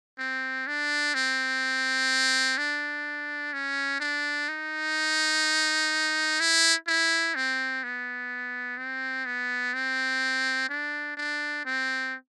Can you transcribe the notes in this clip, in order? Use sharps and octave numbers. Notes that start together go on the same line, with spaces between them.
C4
D4
C4
D4
C#4
D4
D#4
E4
E4
C4
B3
C4
B3
C4
D4
D4
C4